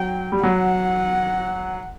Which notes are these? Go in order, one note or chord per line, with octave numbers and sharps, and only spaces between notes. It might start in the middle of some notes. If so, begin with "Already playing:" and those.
Already playing: F#3 G5
G3
F#3 F#5